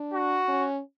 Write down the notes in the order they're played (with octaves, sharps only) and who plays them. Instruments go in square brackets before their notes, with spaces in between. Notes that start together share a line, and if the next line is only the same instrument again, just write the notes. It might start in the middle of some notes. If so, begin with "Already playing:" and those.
Already playing: [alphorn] D4
[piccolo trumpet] F#4
[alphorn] C#4